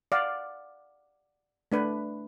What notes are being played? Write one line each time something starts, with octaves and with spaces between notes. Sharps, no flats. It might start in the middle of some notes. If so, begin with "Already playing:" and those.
D5 F5 F#5
A3 D4 B4